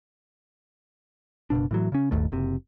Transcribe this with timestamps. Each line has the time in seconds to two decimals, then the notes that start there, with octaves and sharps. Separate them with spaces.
1.50 F#1 C2 B2 D4
1.71 A2 E3 F#3
1.92 C#3 C#4
2.11 D#1 G#1 D#2 A3
2.32 F#1 C3